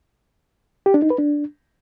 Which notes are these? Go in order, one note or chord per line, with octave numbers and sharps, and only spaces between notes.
G4
D4
D#4
B4
D4